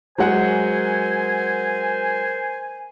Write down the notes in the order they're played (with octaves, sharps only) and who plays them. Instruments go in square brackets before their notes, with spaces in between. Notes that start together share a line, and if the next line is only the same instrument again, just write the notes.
[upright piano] F#3 G#3 F#5 [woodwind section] A#4 C5 G#5